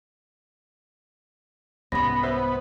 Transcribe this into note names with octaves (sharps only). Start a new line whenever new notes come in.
C2 G#2 B3 C#4 B5 A#6
B4 C5 E5